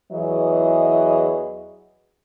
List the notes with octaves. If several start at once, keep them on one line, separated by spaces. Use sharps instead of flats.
E2 E3 F#3 G#4 D#5